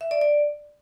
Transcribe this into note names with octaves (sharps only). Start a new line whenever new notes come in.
E5
D5
D5